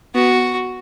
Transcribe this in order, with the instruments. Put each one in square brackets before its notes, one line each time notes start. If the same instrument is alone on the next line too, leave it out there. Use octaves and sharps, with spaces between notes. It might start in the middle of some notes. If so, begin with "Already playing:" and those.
[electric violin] B3 [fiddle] F#4